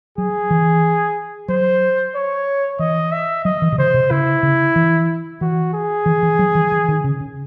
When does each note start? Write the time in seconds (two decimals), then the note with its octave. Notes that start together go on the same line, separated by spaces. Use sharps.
0.18 F#3 G#4
0.51 E3
1.48 F#3 C5
2.15 C#5
2.79 E3 D#5
3.12 E5
3.45 F#3 D#5
3.62 E3
3.72 C3
3.78 C#3 C5
3.94 C3
4.11 C#3 E4
4.43 C#3
4.76 E3
5.41 E3 F#4
5.73 G#4
6.06 E3
6.23 E3
6.39 F#3
6.55 E3
6.72 E3
6.89 D#3
7.04 C#3
7.21 C#3